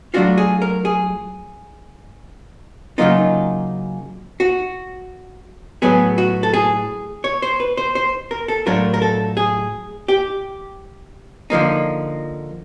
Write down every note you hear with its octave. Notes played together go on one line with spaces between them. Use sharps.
F#3 A3 D4 F4 F#4
G#4
A#4
G#4
C#3 F#3 A#3 D#4 F4
F#4
A2 F#3 B3 G#4
F#4
A4
G#4
C#5
C5
B4
C5
C5
A#4
A4
A2 F#3 A3 D4 F4 A#4
A#4
A4
G#4
G4
D3 F3 A#3 D#4